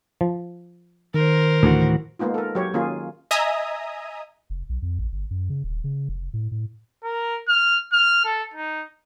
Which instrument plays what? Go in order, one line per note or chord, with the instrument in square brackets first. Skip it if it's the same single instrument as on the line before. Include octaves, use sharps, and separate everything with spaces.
[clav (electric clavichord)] F3
[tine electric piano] D#3 [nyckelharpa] A#4 C5
[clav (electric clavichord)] D2 [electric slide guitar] A2 E3 F#4
[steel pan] G#3 A#3 B3 D#4 F4
A4 A#4
F#3 G4 C#5
D#3 A#3 C#4 F4 G#4
[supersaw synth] D#5 E5 G#5 A#5 D#6
[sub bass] F1
B1
F2
A1
G1
F#2
C#3
D#1
C#3
F1
A2
A2
[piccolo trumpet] A#4
F6
F6
A4
D#4